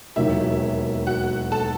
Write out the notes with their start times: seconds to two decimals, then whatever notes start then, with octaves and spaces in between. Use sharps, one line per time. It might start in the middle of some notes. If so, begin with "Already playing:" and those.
0.16 E1 D#2 D#3 F#3 E4 E5
1.07 F#4 F#5
1.52 A4 A5